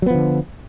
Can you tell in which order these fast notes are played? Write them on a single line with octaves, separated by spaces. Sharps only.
F#3 B3 F3 D3